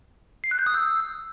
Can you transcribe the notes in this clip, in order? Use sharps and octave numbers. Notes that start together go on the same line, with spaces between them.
C7
F#6
G6
D#6
E6